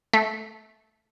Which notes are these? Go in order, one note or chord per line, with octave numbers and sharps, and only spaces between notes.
A3